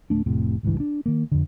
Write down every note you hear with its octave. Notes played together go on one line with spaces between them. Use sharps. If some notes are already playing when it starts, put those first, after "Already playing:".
D1 A3 D4
F1 A2 C3
G#1 C#2 G2 E3
D4
D#3 A#3
F2 D3